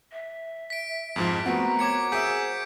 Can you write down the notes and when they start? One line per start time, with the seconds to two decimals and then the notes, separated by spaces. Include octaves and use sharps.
0.12 E5
0.70 B6 D7
1.16 F2 G#2 F3
1.46 A3 B3 C4 F#4 A#4
1.79 C#5 D6 G#6 C#7
2.12 G#4 C5 E5 G#5 G6 B6 D7